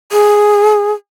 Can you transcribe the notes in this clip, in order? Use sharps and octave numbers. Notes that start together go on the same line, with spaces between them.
G#4